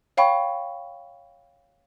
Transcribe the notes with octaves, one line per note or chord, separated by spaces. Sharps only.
C#5 F5 G5 B5 C#6